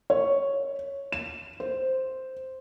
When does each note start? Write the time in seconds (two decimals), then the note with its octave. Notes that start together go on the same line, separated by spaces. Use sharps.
0.10 C#5
1.12 E7
1.60 C5